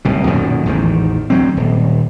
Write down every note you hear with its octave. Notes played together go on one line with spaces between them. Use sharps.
D1 C2 B2
B1 F#2 A#2 D#3
A1 E2 G#2 D#3
D2 F#3 C4
D#1